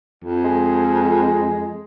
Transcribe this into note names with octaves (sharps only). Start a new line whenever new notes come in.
F2
G#3